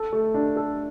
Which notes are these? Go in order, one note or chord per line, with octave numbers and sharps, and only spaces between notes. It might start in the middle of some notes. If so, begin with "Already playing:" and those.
Already playing: A4
A3
D4
A4